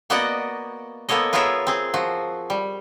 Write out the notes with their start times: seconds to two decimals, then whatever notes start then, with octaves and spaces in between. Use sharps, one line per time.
0.10 A#3 B3 F#4 D5 D#5 F#5
1.09 A#3 B3 A4 C#5 D#5
1.33 B3 F4 G#4 A#4 C#5 E5
1.67 C4 G#4
1.94 F3 F#4
2.50 G3